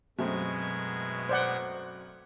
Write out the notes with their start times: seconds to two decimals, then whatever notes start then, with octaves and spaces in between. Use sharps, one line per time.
0.19 F#2 B2 G#3 A3 C4 G#6
1.29 C5 D5 F#5